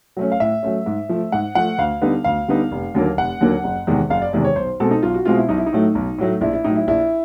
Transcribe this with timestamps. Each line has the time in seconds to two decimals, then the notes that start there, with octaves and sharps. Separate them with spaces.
0.17 F#3 A3 C#4
0.32 F5
0.40 A2 E5
0.63 F#3 A3 C#4
0.86 G#2
1.09 F3 A3
1.32 G#2 F#5
1.55 F3 A3 F#5
1.78 D2 F5
2.02 D3 G3 B3 D#4
2.24 D2 F5
2.48 D3 G3 B3 D#4
2.71 F1
2.95 D#2 D3 F#3 A#3
3.17 F1 F#5
3.41 D#2 D3 F#3 A#3
3.64 F#1
3.87 E2 C3 D#3 G#3
4.10 F#1 F5
4.22 D5
4.33 E2 C3 D#3 G#3 D5
4.44 C#5
4.56 B1 C5
4.80 B2 G#3 C4 A4
4.91 D#4
5.03 B1 F4
5.14 F#4
5.25 B2 G#3 C4 F4
5.37 E4
5.49 B1 D#4
5.58 E4
5.66 D#4
5.73 A2 F#3 A3
5.95 B1
6.18 A2 F#3 A3
6.41 A#1 E4
6.53 E4
6.64 A2 F#3 D#4
6.76 E4
6.87 A#1 E4